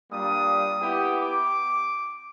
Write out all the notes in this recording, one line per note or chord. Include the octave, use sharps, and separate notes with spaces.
G3 A#3 D4 F4 D#6
B3 E4 G4
D6